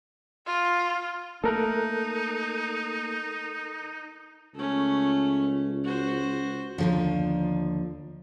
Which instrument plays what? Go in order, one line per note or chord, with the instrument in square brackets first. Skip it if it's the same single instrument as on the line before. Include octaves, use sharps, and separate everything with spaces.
[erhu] F4
[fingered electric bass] A3 A#3 [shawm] D#4 [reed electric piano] A4 A#4 F#6
[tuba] C#2 [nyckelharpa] A3 C#4
[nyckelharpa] F#4 C5
[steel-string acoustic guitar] D#2 D3 F3